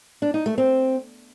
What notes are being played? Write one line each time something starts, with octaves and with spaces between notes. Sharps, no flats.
D4
D#4
A3
C4